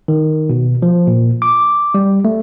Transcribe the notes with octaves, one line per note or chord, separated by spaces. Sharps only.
D#3
B2
F3
A#2
D6
G3
A3